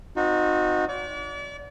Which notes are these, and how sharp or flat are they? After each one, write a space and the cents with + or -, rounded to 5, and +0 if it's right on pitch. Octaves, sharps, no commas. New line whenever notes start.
C4 -15 D#4 -5 F#4 -30
D5 -35 D6 -40